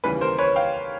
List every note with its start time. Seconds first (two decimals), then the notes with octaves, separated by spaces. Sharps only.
0.04 D#2 C#3 E3 G3 B4
0.21 A#4 C5
0.38 B4 C#5
0.56 F5 G5